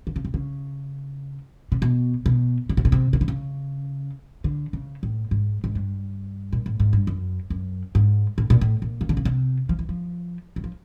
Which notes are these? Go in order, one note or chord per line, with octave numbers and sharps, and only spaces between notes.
D3
C#3
C3
C#3
C3
B2
B2
C#3
C3
B2
C3
C#3
D3
C#3
D3
C#3
A2
G#2
G#2
G2
A#2
A2
G#2
G2
F#2
F#2
G#2
A2
A#2
A2
A#2
D#3
D3
C#3
C3
F3
E3
F3
F#3
F3